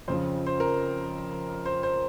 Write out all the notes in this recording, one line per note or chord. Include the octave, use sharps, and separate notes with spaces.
F2 C#3 F3 C5
C5
A#4
C5
C5